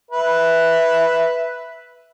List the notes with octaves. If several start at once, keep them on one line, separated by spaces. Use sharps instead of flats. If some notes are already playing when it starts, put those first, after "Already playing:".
B4 E5